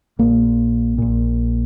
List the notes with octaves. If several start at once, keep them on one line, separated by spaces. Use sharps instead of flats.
A#1 A#2 A#3
A#1 A#2